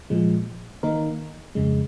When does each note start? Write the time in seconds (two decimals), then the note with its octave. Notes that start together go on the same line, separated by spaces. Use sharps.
0.10 A#2 F3 G#3
0.83 D#3 A#3 D#4 A#4
1.55 F2 C#3 G#3